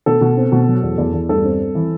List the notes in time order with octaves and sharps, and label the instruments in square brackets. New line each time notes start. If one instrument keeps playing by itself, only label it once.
[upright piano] B2 A4
B2
C4
B2
F#3
E2
E2
E2
G2 A4
C4
C4
E3